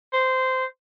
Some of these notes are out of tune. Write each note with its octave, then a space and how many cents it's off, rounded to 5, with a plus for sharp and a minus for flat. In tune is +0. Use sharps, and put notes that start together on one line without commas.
C5 -15